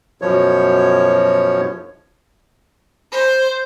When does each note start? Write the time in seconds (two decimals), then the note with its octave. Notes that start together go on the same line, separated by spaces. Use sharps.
0.22 F#2 B2 F3 C#5
3.12 C5